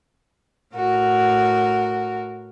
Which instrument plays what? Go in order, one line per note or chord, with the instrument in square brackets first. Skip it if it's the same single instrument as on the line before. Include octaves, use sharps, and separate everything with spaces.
[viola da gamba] A2 F#4 A#4